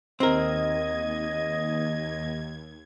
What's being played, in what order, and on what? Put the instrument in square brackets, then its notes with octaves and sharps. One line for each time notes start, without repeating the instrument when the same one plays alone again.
[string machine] D#2 G#6 [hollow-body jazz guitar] C4 A#4 [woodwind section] D#5